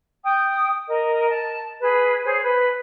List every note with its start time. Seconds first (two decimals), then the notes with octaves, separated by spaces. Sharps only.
0.24 G5 D#6
0.88 A#4 D#5
1.29 A5
1.79 G#4 B4
2.24 G#4 C5 C#5
2.42 B4